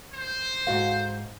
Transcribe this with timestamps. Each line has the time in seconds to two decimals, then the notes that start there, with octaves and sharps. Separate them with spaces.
0.13 C5
0.67 G#2 F#4 F5